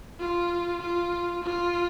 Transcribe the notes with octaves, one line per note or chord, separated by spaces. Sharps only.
F4
F4
F4